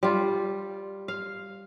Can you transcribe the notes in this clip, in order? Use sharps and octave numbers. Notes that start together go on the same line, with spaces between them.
G3 F4
F5